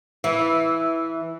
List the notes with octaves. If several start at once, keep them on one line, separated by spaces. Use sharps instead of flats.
E3